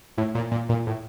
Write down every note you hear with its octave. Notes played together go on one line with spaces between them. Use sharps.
A2
A#2
A#2
A#2
A2